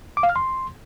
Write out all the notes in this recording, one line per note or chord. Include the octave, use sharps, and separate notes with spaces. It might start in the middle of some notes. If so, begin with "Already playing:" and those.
D6
F5
F6
C6